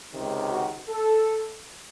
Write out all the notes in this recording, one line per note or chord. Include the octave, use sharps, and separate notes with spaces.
C#2 C3 D#3
F#4
A4